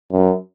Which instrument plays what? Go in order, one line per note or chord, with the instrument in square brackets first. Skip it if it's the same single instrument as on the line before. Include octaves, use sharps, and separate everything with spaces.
[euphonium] F#2